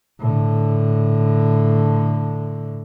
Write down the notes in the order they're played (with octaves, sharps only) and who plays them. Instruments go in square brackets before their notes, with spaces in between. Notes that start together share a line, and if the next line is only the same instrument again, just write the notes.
[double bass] A2 D3